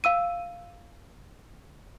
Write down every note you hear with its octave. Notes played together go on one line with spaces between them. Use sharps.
F5 E6 D#7